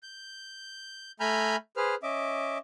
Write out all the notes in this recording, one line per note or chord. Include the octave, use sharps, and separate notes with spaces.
G6
A3 G#5 A#5 B5 F6 G6
G#4 B4 C5 F6
C#4 D#5 E5 D6